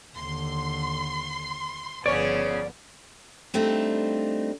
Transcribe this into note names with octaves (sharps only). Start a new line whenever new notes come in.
D#2 D3 C6
G1 C#3 F3 B3 C#4 C#5 D5
G3 A3 C4 D4 D#4 F4